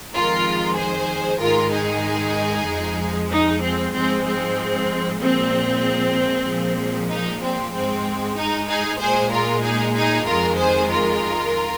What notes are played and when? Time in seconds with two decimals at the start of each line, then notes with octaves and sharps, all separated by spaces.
0.13 F2 D#3 G#3 F4 A#4
0.77 G#4 C5
1.40 G#2 D#3 G#3 F4 A#4
1.71 D#4 G#4
2.67 F2 F3 G#3
3.30 D#4
3.62 C4
3.93 G#2 F3 G#3 C4
4.25 C4
5.20 A#2 F3 G#3 C4
6.47 A#2 F3 G#3
7.10 D#4
7.41 C4
7.73 G#2 G#3 C4
8.36 D#4
8.68 D#4 G#4
9.00 A#2 G#3 G#4 C5
9.31 F4 A#4
9.63 D#4 G#4
9.94 D#4 G#4
10.26 F2 D#3 G#3 F4 A#4
10.58 G#4 C5
10.89 F4 A#4